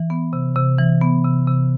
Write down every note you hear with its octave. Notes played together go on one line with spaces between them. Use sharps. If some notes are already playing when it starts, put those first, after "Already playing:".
Already playing: E3
B3
C3
C3
E3
B3
C3
C3